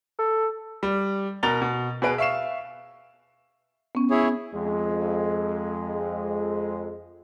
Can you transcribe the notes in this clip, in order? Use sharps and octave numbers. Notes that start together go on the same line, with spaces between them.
A4
G3
B2 A#4 A#5 A6 F7 G7
B2
B2 G#4 B4 D7
E5 F5 C#6 C7 E7
B3 C#4
E4 G#4 C#5
F2 G#3